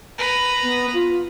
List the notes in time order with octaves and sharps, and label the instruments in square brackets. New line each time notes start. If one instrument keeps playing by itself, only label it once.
[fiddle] B4 A#5
[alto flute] B3
F4